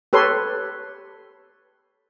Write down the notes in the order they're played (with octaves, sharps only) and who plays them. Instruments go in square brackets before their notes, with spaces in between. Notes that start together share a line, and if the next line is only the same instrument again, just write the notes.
[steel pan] G4 A4 B4 C#5 C6